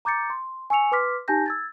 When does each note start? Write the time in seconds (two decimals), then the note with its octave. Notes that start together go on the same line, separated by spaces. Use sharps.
0.05 A#5 D6 G6 A6 C#7
0.30 C6
0.70 G#5 C#6 E6 C#7 F7
0.92 B4 C6 D6 F6 B6
1.28 D#4 G4 G#5 A5 G6 A#6
1.46 E6 G#6 A6